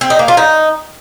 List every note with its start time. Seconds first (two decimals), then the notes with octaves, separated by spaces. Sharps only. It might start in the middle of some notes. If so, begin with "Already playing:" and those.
0.01 C4
0.10 D#4
0.19 A#3
0.28 F4
0.37 D#4